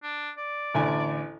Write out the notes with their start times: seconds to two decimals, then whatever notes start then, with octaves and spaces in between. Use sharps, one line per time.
0.03 D4
0.37 D5
0.74 A1 D2 G#5